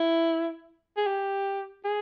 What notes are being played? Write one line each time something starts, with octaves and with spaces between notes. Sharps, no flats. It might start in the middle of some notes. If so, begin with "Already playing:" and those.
Already playing: E4
G#4
G4
G#4